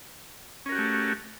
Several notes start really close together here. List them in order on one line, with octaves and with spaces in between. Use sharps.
C#4 A#4 F#4 G4 A3